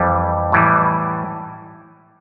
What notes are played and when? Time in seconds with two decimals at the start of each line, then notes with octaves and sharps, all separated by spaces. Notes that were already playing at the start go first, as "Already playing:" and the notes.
Already playing: F2 E3 G3
0.52 A2 E3 G3